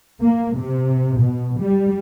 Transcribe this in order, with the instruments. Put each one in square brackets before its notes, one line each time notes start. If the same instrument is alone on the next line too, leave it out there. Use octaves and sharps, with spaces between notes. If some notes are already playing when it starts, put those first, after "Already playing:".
[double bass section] A#3
C3
B2
G3